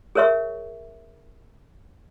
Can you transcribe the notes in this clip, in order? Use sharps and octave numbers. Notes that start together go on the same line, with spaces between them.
G#4 A#4 C#5 E5 C#6